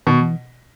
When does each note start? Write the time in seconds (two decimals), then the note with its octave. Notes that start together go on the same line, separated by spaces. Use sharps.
0.07 B2 D#3
0.22 E3